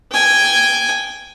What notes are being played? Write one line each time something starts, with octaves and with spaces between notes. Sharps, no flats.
G5 G#5